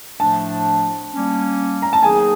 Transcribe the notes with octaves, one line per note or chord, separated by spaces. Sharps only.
A2 F3 A3 D4 A5
G3 A#3 C#4
A#5
A5
D#3 F#3 A#3 D#4 G#4 G#5